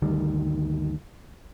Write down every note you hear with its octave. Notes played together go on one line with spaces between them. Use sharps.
G1 D2 D#3 G3